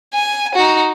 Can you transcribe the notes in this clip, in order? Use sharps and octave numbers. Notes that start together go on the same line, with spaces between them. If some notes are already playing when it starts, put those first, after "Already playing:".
G#5
D#4 F#4